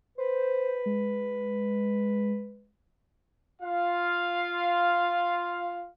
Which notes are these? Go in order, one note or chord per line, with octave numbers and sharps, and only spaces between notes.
B4 C5
G#3
F4 F5